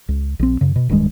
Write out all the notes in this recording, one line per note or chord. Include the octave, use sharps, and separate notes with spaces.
C#2
A#1 C4
F#2 C#3
B2
D1 G2 D#3 G#3